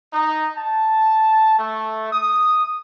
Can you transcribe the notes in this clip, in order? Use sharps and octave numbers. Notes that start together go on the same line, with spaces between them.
D#4
A5
A3
D#6